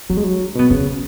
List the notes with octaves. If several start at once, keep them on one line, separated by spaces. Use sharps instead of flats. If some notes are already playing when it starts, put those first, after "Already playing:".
F#3 D4
G#3
F#3
B2 B3
C#3 C#4